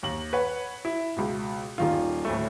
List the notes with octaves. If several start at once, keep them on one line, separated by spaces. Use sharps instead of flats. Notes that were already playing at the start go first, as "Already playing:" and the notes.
D#2 F#7
B4 C#5 F#5
E4
C#2 B2
D#1 D#3 F4
D2 A2 A3